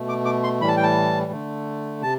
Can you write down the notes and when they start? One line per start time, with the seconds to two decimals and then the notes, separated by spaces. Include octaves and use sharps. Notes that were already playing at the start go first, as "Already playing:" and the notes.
Already playing: B2 A3
0.09 D6
0.25 D6
0.44 C6
0.61 A2 E3 G3 B5
0.68 A5
0.77 G5
0.83 A5
1.31 D3 A3
2.02 C3 A5